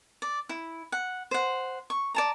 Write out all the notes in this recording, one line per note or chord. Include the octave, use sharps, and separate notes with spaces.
D5
E4
F#5
C5 F#5
C#6
D5 A5 A#5